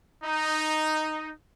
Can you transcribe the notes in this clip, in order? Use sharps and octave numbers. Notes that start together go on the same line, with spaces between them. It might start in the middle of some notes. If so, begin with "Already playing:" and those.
D#4